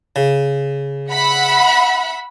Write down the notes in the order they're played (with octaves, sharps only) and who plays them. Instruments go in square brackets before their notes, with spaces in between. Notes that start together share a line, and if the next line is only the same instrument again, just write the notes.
[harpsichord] C#3
[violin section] E5 F#5 B5